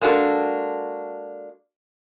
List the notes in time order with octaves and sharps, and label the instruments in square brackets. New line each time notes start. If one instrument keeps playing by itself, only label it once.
[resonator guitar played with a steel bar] G#3 A#3 D4 F#4 A4